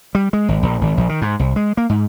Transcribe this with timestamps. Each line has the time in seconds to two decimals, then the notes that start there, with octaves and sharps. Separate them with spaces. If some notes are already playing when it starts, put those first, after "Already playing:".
0.15 G3
0.33 G#3
0.48 G#1
0.63 A#1
0.81 G#1
0.97 A#1
1.09 D#3
1.22 G#2
1.39 C2
1.56 G#3
1.77 A#3
1.89 G#2